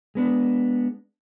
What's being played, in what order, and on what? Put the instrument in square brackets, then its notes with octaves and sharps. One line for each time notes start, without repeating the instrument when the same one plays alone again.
[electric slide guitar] G#3 B3 D4